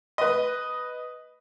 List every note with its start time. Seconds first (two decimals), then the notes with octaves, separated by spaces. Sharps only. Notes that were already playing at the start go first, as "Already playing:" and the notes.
0.18 B4 D#5